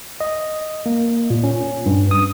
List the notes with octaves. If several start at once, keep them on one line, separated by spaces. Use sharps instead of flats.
D#5
A#3
A#2
C#4
G2
D#6